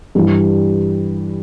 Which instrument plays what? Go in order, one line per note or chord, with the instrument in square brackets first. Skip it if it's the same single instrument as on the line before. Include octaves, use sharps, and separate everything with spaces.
[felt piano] G2 E3 G3